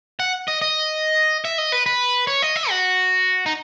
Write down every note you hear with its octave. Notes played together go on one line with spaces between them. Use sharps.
F#5
D#5
D#5
E5
D#5
B4
B4
C#5
D#5
E5
F#4
D#4